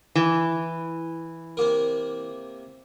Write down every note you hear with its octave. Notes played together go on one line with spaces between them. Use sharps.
E3
C3 A#3 A#4